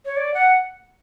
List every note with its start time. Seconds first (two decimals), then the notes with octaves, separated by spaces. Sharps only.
0.05 C#5
0.17 D5
0.34 F#5